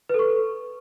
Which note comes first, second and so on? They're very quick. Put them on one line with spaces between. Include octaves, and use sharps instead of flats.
B4 A4 C#6